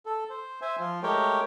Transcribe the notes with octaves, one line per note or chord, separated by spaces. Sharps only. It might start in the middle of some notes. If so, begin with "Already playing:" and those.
A4
C5
C5 E5 G#5
F3 F4
G#3 A3 G4 A#4 C#5 G5